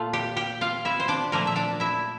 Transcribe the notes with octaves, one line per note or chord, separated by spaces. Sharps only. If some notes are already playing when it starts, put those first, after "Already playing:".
Already playing: A#2 A3 F4 F5
G4 G5
G4 G5
F4 F5
E4 E5
C5
D4 D5
A#2 F3 A3 A#3 A#4
E5
D4 D5
E4 E5